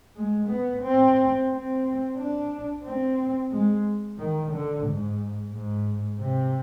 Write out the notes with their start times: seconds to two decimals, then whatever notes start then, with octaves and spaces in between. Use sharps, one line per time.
0.16 G#3
0.49 B3
0.83 C4
1.50 C4
2.17 D4
2.84 C4
3.51 G#3
4.18 D#3
4.52 D3
4.86 G#2
5.53 G#2
6.20 C3